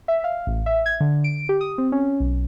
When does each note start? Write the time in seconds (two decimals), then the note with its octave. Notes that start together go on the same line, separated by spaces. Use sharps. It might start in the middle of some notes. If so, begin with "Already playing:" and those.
0.08 E5
0.24 F5
0.47 A1
0.66 E5
0.86 G#6
1.00 D3
1.24 D7
1.49 G4
1.61 D#6
1.78 C4
1.92 C#4
2.20 B1